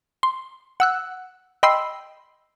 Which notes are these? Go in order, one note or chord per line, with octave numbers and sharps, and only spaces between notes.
C6
F#5 E6 F#6
D#5 G5 B5 C6 E6 C7